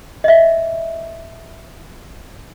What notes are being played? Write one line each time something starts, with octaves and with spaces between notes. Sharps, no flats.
D#5 E5